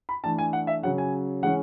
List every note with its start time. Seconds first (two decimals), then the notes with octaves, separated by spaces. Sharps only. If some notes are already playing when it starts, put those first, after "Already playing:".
0.09 B5
0.24 E3 A3 D4 A5
0.38 G#5
0.53 F#5
0.67 E5
0.82 C#3 F#3 C#4 F#5
0.98 G#5
1.43 E3 G#3 C#4 F#5